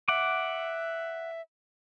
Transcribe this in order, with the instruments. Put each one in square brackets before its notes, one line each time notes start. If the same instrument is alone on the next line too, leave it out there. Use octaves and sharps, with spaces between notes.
[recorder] E5 [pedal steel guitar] F#5 D6